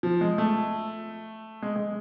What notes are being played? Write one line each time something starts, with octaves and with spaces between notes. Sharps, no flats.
F3
G#3
A3
G#3
G#3